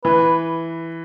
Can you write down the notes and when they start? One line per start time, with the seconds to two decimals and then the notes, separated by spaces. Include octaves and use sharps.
0.04 E3 B4